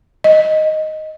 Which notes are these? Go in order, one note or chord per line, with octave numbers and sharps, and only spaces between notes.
D#5